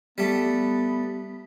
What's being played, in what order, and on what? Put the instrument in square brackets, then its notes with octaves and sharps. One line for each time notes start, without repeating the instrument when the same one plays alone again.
[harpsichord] G3 A3 [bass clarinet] B3